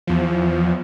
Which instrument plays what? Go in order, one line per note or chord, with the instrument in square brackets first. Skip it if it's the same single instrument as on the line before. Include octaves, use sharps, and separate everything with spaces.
[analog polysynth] E2 F3